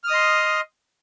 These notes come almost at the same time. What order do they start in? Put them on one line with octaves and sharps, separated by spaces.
F6 D#6 D#5 C6